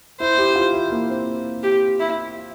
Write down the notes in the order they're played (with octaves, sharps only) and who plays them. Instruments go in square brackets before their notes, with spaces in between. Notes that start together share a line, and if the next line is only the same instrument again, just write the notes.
[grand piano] E4 [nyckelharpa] C5
[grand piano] G4
F4
E4
A#3
C4
[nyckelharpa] G4
E4